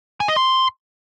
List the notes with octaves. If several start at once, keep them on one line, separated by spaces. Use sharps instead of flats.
G#5
D#5
C6